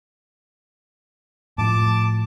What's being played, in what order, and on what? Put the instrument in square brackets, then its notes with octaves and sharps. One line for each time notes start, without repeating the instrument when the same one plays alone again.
[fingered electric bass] A2 F3 [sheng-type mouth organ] A5 D6